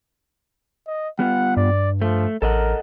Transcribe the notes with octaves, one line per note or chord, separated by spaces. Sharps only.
D#5
G3 B3 F4 F#5
G2 D5
F3 A3
A1 A4 A#4 D#5 F#5